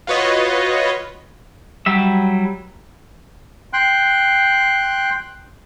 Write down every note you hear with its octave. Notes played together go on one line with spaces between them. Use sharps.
F4 F#4 B4 C#5 D#5
F#3 G3 E5
G5 C6 F#6